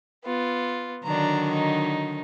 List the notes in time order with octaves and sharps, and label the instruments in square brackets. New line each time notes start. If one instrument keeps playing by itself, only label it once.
[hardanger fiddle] B3 F4
[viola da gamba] D3 D#3 F#3 [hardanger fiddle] D4 A#5
[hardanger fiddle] D#4